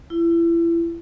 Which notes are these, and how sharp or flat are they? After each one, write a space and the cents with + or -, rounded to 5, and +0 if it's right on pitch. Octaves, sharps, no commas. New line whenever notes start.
E4 +30